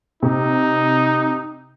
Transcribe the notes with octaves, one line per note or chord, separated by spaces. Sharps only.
C3 D#4